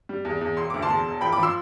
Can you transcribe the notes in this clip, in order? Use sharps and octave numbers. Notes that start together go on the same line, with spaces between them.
G3
E2
E2
E1 C6
D2 D6
A5 C6
E2
E1
F3 G5 B5
B5 D6
F3 C6 E6